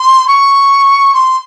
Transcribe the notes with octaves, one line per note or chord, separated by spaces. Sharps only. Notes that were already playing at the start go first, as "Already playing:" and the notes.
Already playing: C6
C#6
C6